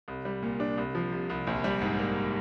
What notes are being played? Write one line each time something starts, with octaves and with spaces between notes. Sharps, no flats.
C2
G3
A#2
D4
C2
F3
C3
C2
A#1
G3
G#2
A#3